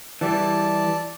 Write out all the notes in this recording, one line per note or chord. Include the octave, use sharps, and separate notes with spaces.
E3 G3 D5 A5